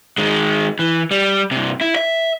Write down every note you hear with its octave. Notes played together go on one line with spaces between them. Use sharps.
D#3 G#3
E3
G3
G2 C3
E4
E5